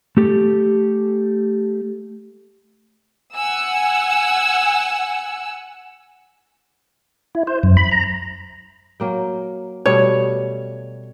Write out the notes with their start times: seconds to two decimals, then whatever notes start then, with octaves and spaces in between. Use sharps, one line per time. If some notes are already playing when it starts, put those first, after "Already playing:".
0.17 A3 G4 A4
3.34 F#5 G#5 E6
7.35 E4
7.47 C5
7.63 F#2
7.77 B5
7.91 A#5
9.00 F#3 A#3 G5
9.86 B2 G3 A3 C#5